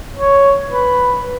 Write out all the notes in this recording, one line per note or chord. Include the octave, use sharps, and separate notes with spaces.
C#5
B4